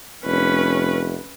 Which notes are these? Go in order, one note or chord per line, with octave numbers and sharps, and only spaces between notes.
F1 C#4 B4